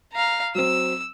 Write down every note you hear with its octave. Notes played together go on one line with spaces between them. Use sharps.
F5 A#5
F#3 C4 E6